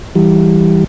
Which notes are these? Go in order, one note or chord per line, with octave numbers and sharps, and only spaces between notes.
E3 G3